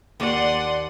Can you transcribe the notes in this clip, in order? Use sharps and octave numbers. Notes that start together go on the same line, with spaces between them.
D#2 D5 F#5 C6 D#7